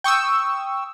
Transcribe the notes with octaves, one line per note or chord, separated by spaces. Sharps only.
G5 C#6 D#6 E6